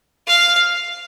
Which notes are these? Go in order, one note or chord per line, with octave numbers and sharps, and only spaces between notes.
F5